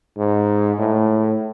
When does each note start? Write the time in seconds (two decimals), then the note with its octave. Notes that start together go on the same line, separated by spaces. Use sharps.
0.18 G#2
0.79 A2